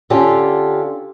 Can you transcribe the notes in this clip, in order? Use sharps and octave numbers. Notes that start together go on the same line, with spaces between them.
D3 C#4 F4 G4 A4